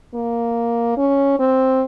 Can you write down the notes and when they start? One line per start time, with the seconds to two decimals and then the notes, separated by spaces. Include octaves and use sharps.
0.15 A#3
0.97 C#4
1.39 C4